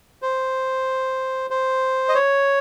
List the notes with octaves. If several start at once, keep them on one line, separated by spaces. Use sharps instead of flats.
C5
C5
D#5
C#5